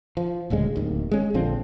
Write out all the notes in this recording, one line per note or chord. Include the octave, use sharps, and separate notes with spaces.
F3
D#1 D2 C#3 G#3
D1 D#2
G#3 C#4
A#1 D3 F3 C4